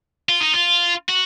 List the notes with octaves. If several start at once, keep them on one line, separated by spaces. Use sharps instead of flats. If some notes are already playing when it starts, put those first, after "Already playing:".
F4
D#4
F4
F#4